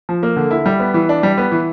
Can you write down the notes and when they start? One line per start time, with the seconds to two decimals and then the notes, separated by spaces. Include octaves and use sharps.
0.09 F3
0.23 A#3
0.36 D3
0.51 E4
0.66 G3
0.80 B3
0.94 E3
1.09 D4
1.23 G3
1.38 B3
1.52 E3